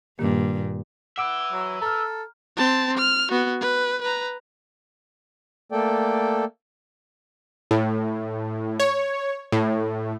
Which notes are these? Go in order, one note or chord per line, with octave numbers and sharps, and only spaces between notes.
G2 A#2 D#3 A#3 G4
B4 E5 F#5 D6 D7
F#3
A4 A#5 F6
C4 A5
F6
B3 F#4
B4
B4 A#5
A3 A#3 A4 D5 G5
A2
C#5
A2